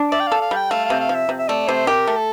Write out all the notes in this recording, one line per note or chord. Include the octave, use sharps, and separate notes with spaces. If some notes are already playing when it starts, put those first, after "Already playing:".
Already playing: D4
D5 E5
G5
A4 F5
F5
G3 G5
A3 F5
F5
C3
F5
F3
E5
C3
E5
A3 D5
C3 C5
G4 A#4
A3
A4